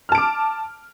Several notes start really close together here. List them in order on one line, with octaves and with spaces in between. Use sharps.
F6 A5 D7 D6